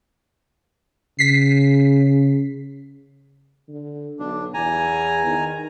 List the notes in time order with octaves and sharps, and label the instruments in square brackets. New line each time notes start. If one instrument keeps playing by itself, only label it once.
[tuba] C#3 [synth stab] B6 C7
[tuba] D3
[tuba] B1 [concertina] D4
[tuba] E2 [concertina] G#5 A#5
[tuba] D#3